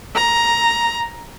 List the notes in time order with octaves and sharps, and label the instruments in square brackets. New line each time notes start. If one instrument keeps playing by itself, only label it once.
[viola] A#5